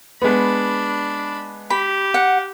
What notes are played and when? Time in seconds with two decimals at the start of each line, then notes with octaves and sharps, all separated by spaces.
0.22 G#3 B3 D4 B5
1.70 G4 B5
2.14 F#5